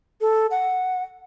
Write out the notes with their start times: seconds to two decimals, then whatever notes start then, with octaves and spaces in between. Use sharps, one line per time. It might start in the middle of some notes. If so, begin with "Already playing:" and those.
0.21 A4
0.51 F#5